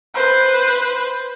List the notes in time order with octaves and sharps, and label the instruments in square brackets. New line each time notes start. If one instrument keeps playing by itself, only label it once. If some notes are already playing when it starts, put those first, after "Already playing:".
[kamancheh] B4 C5